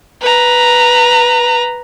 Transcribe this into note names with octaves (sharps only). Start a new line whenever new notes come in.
B4 A#5